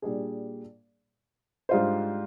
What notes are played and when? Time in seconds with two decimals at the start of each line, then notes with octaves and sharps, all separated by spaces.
0.02 A#2 G3 D4 G#4
1.69 G#2 G3 D4 F4 C5